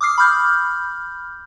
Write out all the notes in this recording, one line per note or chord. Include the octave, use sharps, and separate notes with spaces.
D6 D#6 F6 C7
B5 D6 F6 G6